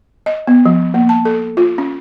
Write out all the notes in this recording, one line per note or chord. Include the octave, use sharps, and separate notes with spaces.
D#5
B3
F3
A#3
A5
A4
F4
C#4